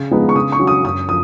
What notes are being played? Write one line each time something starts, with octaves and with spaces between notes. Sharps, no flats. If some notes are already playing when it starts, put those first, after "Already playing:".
Already playing: C#3
F3 G#3 B3 D#4
C#6
C#3 D#6
C#6
F#3 C#4
D#6
F#2 D#6
F3 D#6